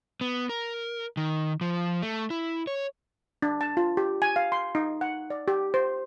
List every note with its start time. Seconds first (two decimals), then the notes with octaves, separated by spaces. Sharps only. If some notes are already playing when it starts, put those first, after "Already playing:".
0.21 B3
0.49 A#4
1.17 D#3
1.61 F3
2.02 A3
2.30 E4
2.67 C#5
3.42 D4
3.61 A5
3.77 F4
3.97 G4
4.22 G#5
4.36 F5
4.52 C6
4.75 D#4
5.01 F#5
5.30 D5
5.48 G4
5.74 C5